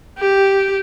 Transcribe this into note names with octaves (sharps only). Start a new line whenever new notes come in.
G4